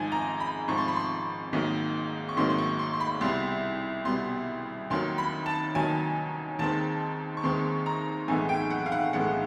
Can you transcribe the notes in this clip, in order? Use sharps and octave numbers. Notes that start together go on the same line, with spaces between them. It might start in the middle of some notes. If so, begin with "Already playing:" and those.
Already playing: G#1 G#2 F3 G#5
A#5
B5
G#1 G#2 F3 C#6
C6
B5
C6
G#1 G#2 D#3 F#3 A#3
C#6
G#1 G#2 D#3 F#3 A#3 C6
C6
C#6
C6
C6
B5
C2 B2 G3 B3 C6
C2 B2 G3 B3 C6
D#2 D#3 F#3 C6
B5
A5
D#2 D#3 F#3 G#5
D#2 D#3 G#3 C4 A5
C#6
D#2 D#3 G#3 C4 C6
A#5
B1 A2 E3 G#3 B3 G#5
G5
F#5
F5
F#5
B1 A2 E3 G#3 B3 F#5